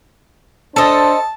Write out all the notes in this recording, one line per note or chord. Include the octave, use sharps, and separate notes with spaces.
D4 A4 C5 D#5 A5